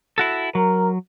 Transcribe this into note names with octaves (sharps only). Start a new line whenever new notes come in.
E4 F#4 A4
F#3 A#4